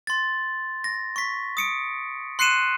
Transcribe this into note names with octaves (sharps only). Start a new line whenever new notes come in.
C6 A6
A#6
C#6 B6
D#6 C#7 D7
C6 F#6 C7 C#7 D#7 E7